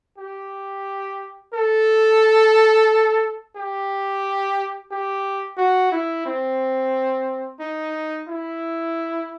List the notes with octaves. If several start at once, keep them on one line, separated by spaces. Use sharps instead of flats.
G4
A4
G4
G4
F#4
E4
C4
D#4
E4